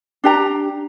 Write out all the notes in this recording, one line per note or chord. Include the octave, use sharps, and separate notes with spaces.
D4 G4 A#5